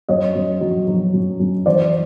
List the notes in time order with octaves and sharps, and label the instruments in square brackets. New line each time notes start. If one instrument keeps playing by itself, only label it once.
[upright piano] F#2 C#5 D#5
F#2
F#3
F#3
F#2
F#2
E3 C5 D5